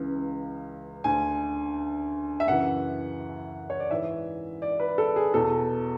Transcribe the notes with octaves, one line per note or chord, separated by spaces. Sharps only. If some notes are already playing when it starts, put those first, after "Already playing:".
Already playing: C#2 C#3 E3
D2 D3 G#5
E5
F#2 C#3 E3 F#5
C#5
D5
G#2 E3 E5
D5
B4
A4
G#4
E2 B2 A4